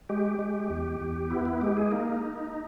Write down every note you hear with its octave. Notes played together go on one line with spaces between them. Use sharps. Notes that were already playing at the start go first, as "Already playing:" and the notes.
G#3 G4
G#3
E2
E2
B3 E4
E4
G#3 G4
G#4
A#3 D#4